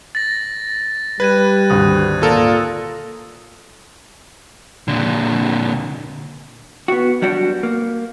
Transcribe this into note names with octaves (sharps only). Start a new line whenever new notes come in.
A6 A#6
G3 B4 F#6 G#6 D#7
G#1 D2 D#6
A#2 F4 A4 A#4
A#2 D3
B3 F#4
F#3 G3 D4 F#4
A#3